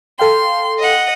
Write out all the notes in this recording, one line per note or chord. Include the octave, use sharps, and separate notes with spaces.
A4 F5 G5 C6
D#5 F#5